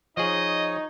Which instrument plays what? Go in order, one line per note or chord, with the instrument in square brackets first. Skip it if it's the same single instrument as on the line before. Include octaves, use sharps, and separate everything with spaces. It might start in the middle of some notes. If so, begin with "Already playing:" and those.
[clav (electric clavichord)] F3 G#4 [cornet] D#4 [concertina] C#5 [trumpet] D#5